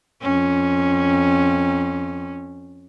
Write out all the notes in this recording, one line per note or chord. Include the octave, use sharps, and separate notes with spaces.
F2 C#4